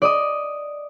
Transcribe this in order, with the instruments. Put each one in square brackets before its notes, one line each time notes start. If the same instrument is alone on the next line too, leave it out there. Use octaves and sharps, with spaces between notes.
[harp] D5 D#5 D#6